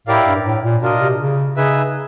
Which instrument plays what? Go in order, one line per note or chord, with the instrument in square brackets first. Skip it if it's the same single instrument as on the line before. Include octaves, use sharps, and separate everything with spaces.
[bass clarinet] A2 [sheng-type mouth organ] E4 G4 A#4 D5 F5
[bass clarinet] G2
A2
A#2
[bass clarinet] B2 [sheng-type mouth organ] D4 F4 A#4 D#5
[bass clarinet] C3
C#3
[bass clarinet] C#3 [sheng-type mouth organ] D#4 G#4 B4 E5